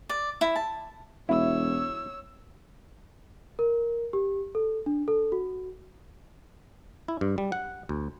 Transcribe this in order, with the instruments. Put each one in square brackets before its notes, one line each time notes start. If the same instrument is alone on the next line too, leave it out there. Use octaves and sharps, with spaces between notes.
[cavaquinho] D5
E4
A5
[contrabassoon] E1 [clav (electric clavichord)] E4 [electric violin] C#5 E6
[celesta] A#4
G4
A4
D4
A4
F#4
[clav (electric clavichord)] E4
G2
G3
F#5
D2